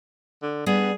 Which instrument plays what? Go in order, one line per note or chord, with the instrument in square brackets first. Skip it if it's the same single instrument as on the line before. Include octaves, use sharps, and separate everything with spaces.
[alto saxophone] D3
[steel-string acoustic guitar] G3 B3 D4 [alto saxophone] G#4